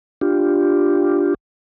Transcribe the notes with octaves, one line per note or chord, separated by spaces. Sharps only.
D4 F4 G4